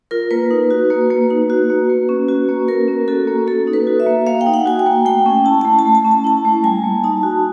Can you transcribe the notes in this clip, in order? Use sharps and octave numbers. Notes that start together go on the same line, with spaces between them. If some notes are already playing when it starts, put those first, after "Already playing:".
F4 A#4
A#3 B4
D#4
F#4
A#3
A#3
D#4
F#4
A#3
A#3
C#4
F#4
A#3
A#3 A#4
C#4
F#4 A4
A#3
A#3 A4
D#4
B4
F#4
E5
A#3
A#3 F5
G5
D#4
F#5
F#4 G#5
G5
A#3
A3 G5
C#4
E4 A5
A5
A3
A5
A3
A5
C#4
A5
E4 A5
A3
G3 G#5
A#3
D#4 A5
F#4